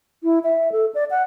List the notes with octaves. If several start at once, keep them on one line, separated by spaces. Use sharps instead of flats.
E4
E5
A4
D5
F#5